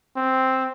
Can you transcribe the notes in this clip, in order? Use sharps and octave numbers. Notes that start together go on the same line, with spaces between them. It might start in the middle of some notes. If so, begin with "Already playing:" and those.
C4